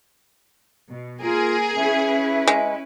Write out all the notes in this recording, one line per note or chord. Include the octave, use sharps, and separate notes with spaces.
B2
A#3 F4 G#4 A#4
C#4 E4 B4 E5
G#3